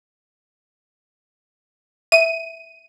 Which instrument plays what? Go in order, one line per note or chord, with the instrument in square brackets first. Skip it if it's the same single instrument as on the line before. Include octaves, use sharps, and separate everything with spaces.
[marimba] E5 [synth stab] D#7